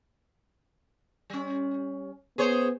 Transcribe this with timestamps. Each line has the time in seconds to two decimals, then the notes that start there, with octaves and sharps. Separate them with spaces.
1.30 G3 C#4
2.38 B3 G#4 C5 C#5